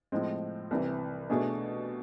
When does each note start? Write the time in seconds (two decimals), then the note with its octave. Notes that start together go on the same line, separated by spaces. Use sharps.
0.12 A2 F3 G#3 C4
0.71 C2 C3 E3
1.29 B2 A3 D4 G#4